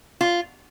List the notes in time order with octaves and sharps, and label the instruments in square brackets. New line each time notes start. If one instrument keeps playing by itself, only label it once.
[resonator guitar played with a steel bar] F4